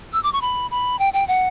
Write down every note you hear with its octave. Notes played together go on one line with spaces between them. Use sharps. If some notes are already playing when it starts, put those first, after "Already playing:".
E6
D6
C#6
B5
B5
G5
G5
F#5